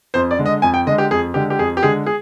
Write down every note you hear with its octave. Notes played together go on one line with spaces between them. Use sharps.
F2 C5
D5
D3 G#3
D#5
F2 G#5
G5
D3 G#3 D#5
G4
F2 G#4
D3 G#3 G4
G4
F2 G#4
G4
D3 G#3 G#4
G#4